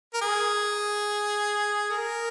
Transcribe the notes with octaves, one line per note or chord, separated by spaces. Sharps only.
A#4
G#4
A#4